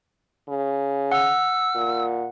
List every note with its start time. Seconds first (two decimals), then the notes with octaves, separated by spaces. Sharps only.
0.48 C#3
1.12 F#5 E6
1.75 A#2